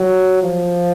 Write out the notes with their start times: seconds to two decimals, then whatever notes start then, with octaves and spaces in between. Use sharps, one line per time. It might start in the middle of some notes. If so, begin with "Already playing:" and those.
Already playing: F#3
0.42 F3